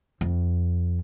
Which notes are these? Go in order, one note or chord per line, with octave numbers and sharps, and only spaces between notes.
F2